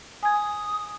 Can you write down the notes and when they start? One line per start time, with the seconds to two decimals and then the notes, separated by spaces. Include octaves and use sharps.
0.23 G#5 D#6 G#6